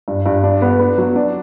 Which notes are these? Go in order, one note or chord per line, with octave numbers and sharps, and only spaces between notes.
G2
G2
D4
B3
B3
F#3
D4